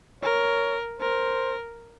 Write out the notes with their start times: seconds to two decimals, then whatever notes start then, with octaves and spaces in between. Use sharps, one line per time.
0.23 A#4 C#5
1.00 A#4 C5